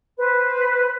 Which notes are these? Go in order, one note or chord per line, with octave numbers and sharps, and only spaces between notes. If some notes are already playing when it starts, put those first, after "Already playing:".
B4 C5